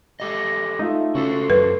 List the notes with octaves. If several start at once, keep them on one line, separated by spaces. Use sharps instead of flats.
A3 G4 D#5
A3 D#4 F4 E5
C#3 F#4 A4 C5
F#2 B4